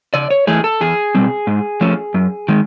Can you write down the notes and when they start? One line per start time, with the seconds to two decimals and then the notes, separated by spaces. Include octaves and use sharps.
0.14 C#3 D5
0.31 C#5
0.47 E3 A3 G#4
0.64 A4
0.81 E2 G#4
1.15 B2 G3 C4
1.47 G#2
1.81 F3 A3 C#4
2.14 F#2
2.48 D#3 G#3